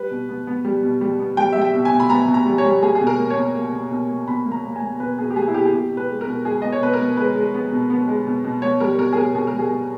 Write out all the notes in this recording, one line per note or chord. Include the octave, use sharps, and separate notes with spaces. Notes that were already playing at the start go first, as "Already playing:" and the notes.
Already playing: G3 B4
B2
B3
B3
G3
B2
G3
B3
G3 G5
G3 E5
G5
B2
G#5
B2
B5
B3 A#5
B2
A#5
G3
C#5
G3
A#3 G#4
G#4
B2
A#4
A#3
C#5
B2
A#3
B2
B2
A#3
B2 B5
A#3
A#5
A#3
G#5
A#3
B2 B4
B2 G#4
G4
A#3 G#4
E4
B2 G4
G#4
B2 G4
B2
B4
G#3
A#4
B2
G#3 G#4
B3 D#5
C#5
B2 B4
A#4
B3
G#3 B4
G#3
B3
B2
B3
G#3
B2
B2
B3 C#5
G3 A#4
B2 A#4
G#4
B2 A#4
B2 G#4
A#4
G3
G#4
B3